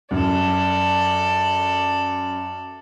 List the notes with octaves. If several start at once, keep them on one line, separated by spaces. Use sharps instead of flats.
F#2 A4 D5